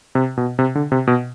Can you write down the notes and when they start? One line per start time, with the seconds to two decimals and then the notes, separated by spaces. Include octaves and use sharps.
0.15 C3
0.37 B2
0.59 C3
0.75 D3
0.92 C3
1.07 B2